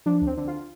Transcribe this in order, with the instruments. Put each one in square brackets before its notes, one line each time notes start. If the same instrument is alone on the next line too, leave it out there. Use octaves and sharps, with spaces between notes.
[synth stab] F3 D4
D2
C4
D3
F4